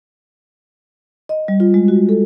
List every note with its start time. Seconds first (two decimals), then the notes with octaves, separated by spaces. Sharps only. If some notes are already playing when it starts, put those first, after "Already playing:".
1.29 D#5
1.48 G3
1.60 F4
1.74 G#3
1.88 F#4
2.09 A4